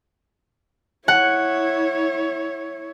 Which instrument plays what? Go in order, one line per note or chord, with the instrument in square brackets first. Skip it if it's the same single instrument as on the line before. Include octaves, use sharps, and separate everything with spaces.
[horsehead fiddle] E4 C#5 [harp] F#5